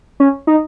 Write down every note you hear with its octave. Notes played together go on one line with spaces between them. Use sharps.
C#4
D#4